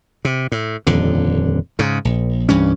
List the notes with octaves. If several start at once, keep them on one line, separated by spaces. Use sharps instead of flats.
C3
A2
D#1 F2 D3
G#2 C#3
A#1
C2 G2 E3 C#4